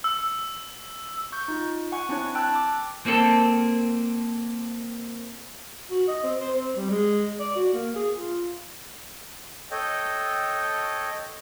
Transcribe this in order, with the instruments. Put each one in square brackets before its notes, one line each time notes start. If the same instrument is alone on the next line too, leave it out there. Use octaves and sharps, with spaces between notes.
[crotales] E6
[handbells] C#6 G6
D#4 F4
F#5 G#5 C#6
C4 D4 E4 C#5
G5 A5 E6 F#6
D6
[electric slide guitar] F3 A#3 C4 A4 A5
[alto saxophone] F#4
D#5
C4
C5
C4
G3
G#3
D5
F#4
A#3
G#4
F4
[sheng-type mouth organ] A4 C#5 D#5 G5